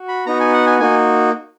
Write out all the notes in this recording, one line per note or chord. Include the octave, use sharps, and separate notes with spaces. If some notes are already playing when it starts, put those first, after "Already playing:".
Already playing: F#4
B5
B3 D#4 F#4 A#5
G#5
F#5
G#5
A#3 D#4 F#4 G#5